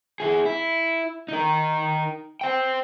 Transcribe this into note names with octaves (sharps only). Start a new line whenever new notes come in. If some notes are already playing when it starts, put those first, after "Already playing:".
E4 G#4
E4
D#4 A#4
C5 G5